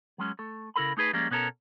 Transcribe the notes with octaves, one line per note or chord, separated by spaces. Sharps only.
F#3 G#3 C#4
A3 A4
C#3 E4 A4 A#4 B5
A3 D#4 G#4 B4
F3 G3 G#3 A#3 C#4
B2 B3 C#4 A4 A#4